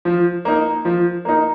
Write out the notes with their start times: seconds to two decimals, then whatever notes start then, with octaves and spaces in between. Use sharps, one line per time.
0.05 F3
0.45 A#3 D#4
0.85 F3
1.25 A#3 D#4